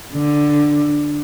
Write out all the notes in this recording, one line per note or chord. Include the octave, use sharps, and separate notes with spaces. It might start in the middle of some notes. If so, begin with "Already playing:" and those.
D3